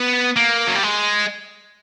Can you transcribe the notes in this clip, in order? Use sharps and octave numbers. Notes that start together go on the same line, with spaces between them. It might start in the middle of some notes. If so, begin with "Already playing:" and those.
Already playing: B3
A#3
F#3
G3
G#3